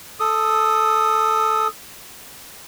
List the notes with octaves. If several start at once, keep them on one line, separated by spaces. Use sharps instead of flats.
A4 D#6